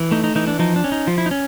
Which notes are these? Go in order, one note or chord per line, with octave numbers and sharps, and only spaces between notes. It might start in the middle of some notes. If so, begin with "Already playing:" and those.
Already playing: E3
A3 D#4
D#4
E3 D#4
D4
F3 D#4
D4
C#4
D#4
F3 F4
E4
D#4
C#4